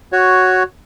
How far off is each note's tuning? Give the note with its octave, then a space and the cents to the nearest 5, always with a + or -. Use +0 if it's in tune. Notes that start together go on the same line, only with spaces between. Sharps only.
F#4 +0 C#5 +0